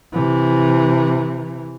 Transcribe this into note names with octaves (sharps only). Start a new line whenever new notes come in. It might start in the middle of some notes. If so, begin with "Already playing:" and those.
C3 E3